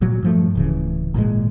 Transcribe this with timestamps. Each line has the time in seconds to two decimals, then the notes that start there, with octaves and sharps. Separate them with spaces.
0.01 A#2 F#3
0.23 G2 F3 A3
0.55 D1 C#3 E3
1.14 G#1 A#2 F3 G#3